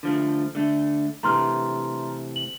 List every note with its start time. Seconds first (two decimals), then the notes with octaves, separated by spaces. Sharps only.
0.03 D3 F3 A3
0.55 D3 A3
1.23 C3 E3 A3 A#5 C6 F6
2.36 F#7